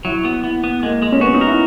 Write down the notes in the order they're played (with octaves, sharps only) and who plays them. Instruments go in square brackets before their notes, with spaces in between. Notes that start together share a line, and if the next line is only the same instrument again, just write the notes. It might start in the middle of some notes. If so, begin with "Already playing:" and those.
[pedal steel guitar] F#3 [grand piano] E4
[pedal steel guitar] B3
[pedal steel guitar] B3 [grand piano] E4
[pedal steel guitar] B3
[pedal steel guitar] G#3 [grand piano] A#3
[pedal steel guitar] G#3
[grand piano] C#4
[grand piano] B3 [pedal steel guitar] F#4
[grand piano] D#4
[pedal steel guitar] A#4
[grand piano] E4